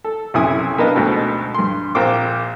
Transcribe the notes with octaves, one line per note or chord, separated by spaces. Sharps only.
A4
B1 F#2 C3 E4 G#5 D#6
A#3 B3 D4 B4 D#5
D2 G#2 B2 C4
G2 C6
A#1 A#3 C4 C5 G5 D6